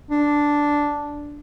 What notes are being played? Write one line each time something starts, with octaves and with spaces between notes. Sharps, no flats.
D4